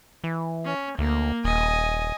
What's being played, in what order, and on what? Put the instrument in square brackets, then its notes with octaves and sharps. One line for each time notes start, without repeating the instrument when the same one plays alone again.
[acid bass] E3
[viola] C#4
[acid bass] D2 [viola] A#3
[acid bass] D#1 [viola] D#5 G#5